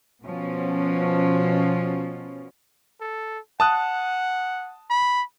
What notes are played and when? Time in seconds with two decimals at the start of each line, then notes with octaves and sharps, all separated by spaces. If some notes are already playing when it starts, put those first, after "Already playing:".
0.23 B2 F3 C#4
3.01 A4
3.60 F#5 A5 D#6 F#6
4.90 B5